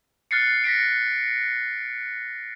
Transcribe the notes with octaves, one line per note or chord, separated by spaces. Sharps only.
F6 F#6 A6 C7 C#7
A#6 B6 C#7 D7